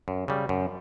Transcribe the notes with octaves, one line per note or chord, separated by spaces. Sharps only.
F#2
C#3 G3
F#2